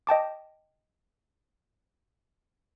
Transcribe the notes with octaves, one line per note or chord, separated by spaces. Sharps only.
D#5 G5 A5 D6